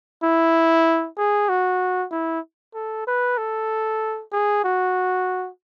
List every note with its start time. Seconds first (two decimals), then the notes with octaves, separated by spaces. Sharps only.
0.23 E4
1.17 G#4
1.49 F#4
2.11 E4
2.74 A4
3.07 B4
3.38 A4
4.32 G#4
4.64 F#4